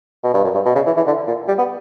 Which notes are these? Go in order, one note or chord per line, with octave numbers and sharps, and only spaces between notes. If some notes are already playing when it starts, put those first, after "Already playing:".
B2
G2
F#2
G2
B2
C#3
E3
E3
D3
A#2
G3
B3